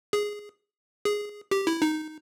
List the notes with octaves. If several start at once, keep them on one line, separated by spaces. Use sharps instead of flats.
G#4
G#4
G4
E4
D#4